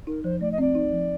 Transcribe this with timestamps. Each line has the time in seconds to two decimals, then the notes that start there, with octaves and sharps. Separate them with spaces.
0.07 D#4 A#4
0.24 F3 C5
0.41 A3 D5
0.52 D#5
0.58 C4 D5
0.75 D#4
0.93 F3